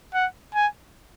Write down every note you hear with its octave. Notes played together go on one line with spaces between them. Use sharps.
F#5
G#5